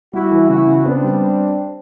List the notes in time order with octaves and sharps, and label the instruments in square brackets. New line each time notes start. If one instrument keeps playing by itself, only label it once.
[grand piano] G3 [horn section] E4 F#4
[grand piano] E3
[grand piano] C#3 [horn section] E4 F#4
[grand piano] C#3
[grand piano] B3 [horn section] C4 D4
[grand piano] G3